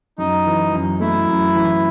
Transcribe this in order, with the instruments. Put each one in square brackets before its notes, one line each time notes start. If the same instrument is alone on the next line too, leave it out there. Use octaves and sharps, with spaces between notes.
[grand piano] F#2 [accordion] D#4
[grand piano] E3
F#2
[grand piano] A3 [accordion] E4
[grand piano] F#2
E3